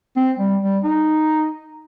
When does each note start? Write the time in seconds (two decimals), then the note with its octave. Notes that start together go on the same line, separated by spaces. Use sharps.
0.16 C4
0.39 G3
0.62 G3
0.84 D#4